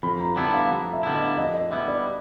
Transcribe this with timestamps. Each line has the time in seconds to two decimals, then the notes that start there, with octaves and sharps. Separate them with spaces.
0.03 F2 B5
0.20 A#5
0.36 D3 G3 B3 E4 A5
0.53 F5
0.71 F2
0.93 E5
1.03 D3 G3 B3 E4
1.15 D#5
1.37 F2 D#5
1.54 D#5
1.70 D3 G3 B3 E4 E5
1.88 D5